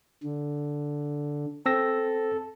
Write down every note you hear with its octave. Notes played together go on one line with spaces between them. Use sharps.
D3
C4 A4 E6 A#6